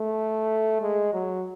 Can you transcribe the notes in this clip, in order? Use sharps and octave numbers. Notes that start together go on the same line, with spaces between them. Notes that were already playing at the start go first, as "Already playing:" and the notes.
Already playing: A3
G#3
F#3